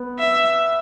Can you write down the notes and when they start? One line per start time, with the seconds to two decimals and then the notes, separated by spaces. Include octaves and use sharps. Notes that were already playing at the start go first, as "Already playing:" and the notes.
Already playing: B3 B4
0.19 E5